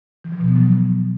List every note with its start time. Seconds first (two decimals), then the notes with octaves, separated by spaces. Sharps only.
0.24 E3
0.32 F3
0.40 B2
0.48 B3
0.56 F#3